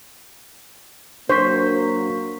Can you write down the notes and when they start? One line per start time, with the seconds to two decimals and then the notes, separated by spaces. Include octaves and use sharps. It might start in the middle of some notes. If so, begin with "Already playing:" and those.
1.30 F#3 A#3 D4 C5 C#6 B6